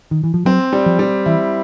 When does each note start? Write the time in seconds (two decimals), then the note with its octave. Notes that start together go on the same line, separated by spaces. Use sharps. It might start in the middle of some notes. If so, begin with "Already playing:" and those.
0.11 D#3
0.24 E3
0.34 F3
0.45 F#3 C4
0.73 G3
0.86 F3
0.99 G3
1.26 E3 E4